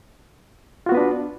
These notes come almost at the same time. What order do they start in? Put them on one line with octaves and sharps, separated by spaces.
F4 F#4 B3 B4 D4